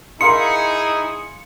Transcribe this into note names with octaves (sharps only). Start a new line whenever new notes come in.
D#4 E4 G#4 A#4 F5 C6 C#7